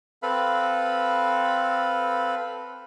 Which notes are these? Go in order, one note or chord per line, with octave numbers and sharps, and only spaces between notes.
C4 A4 B4 F5 B5